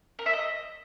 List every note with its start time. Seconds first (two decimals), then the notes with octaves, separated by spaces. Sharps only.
0.19 A#4
0.26 E5
0.33 D#5